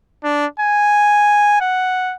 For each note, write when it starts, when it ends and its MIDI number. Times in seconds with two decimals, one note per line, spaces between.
0.24 0.46 62
0.60 1.57 80
1.61 2.15 78